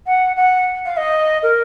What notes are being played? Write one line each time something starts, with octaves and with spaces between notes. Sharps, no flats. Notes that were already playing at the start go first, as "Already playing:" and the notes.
F#5
F#5
F5
D#5
A#4